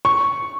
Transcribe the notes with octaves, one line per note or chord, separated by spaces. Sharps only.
C#6